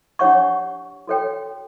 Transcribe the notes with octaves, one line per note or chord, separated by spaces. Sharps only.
D4 G4 C#5 F#5 C#6
F#4 A4 C#5 G5